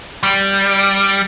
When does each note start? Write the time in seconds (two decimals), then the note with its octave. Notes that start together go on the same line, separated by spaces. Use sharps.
0.23 G3